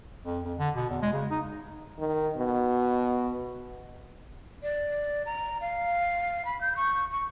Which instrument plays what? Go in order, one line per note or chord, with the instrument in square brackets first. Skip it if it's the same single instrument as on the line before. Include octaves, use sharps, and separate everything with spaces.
[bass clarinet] F2
F2
D3
B2
E2
G#3
C#3
D#4
[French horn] D#3
B2
[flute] D5
A#5
F5
B5
G6
C#6
C#6